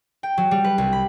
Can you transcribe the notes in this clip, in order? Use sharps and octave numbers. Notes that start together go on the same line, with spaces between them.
G5
F#3
G3
B4
C2
B5